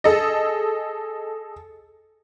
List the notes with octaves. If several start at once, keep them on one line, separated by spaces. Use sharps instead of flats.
G#4 A4 D#5